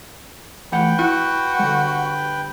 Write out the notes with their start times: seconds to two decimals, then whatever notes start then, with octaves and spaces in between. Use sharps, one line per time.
0.72 E3 A3 B4 F#5 G5
0.99 E4 F#4
1.59 D3 G3